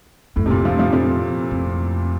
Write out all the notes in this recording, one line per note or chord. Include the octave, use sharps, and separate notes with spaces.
F2 A2
C3
A#2
F3
F3
F3
F2